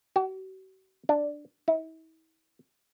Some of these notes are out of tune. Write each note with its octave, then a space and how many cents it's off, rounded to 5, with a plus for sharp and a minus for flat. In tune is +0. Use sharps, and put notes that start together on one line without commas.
F#4 +45
D4 +5
E4 -40